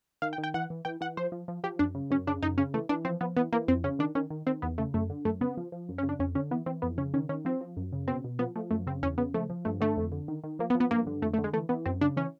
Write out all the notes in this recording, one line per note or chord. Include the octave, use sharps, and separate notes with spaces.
D#3 F5
G5
D#3
G5
E3 F#5
E3
E3 G5
E3 F#5
F3 C5
F3
F3
F3 G4
F#2 D4
C#3
F#2 C#4
C#3 D4
F#2 D#4
C#3 C#4
E3 A3
E3 D4
F3 C4
F3 B3
E3 B3
E3 A#3
F2 C4
C#3 C#4
D#3 D4
D#3 C#4
D#3
D#3 C4
E2 B3
C#3 A3
F#2 A3
D3
F#2 A3
C#3 B3
F3
F3
F#2
C#4
C#3
D4
F2 C#4
D3 C#4
E3 B3
E3 C4
F2 B3
C#3 C#4
D#3 C#4
D#3 C#4
F3 C4
F3
F#2
C#3
B2 C4
B2
F3 B3
F3 A3
F#2 A3
C#3 C4
E2 C#4
C#3 B3
F3 A3
F3
G2 A3
D3 A3
F2
D3
D#3
D#3
F3 A#3
B3
F3
B3
G2 A#3
D3
F2 A3
A3
D3
G#3
E3 A3
E3 B3
F#2 C4
C#3 D4
E3 C#4